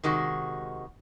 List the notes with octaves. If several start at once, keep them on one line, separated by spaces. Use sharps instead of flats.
C3 D#3 G#3 F#4